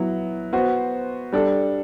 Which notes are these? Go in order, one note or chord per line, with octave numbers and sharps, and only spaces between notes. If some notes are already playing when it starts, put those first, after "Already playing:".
Already playing: F#3 B3 E4
B3 F#4 C5
G3 D4 A4